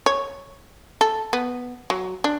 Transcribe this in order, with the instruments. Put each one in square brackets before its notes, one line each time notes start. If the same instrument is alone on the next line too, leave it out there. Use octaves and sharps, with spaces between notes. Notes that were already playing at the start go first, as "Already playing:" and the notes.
[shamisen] C#5
A4
B3
F#3
D4